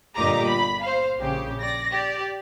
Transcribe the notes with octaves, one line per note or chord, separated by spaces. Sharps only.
G1 A#2 G4 D#5 A#5 D6
B5
C5 F5
A#1 C#3 G4
D5 A#6
G4 D5